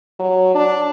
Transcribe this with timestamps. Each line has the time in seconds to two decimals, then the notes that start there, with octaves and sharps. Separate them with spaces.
0.19 F#3
0.55 D4